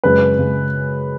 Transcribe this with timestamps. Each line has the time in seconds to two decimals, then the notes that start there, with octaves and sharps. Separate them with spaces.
0.04 F#2 C#3 G#3 B4
0.39 C#3 G#3